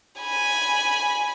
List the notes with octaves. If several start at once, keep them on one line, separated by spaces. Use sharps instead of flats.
G#5 B5